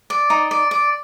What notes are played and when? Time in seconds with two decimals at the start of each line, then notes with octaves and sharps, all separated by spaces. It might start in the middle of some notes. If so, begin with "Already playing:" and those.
0.10 D5
0.30 D#4
0.51 D5
0.71 D5